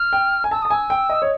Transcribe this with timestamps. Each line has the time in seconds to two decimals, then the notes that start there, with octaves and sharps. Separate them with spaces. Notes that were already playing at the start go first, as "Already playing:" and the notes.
Already playing: F6
0.13 G5
0.44 G#5
0.51 A5 E6
0.62 A5 D#6
0.70 G#5 E6
0.90 G5
1.09 D#5
1.22 C#5